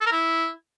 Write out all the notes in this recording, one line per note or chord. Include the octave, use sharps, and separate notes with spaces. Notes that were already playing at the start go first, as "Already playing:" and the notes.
A4
A#4
E4